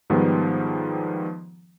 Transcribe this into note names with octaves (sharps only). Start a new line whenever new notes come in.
G#2 D#3 F3 G3 B3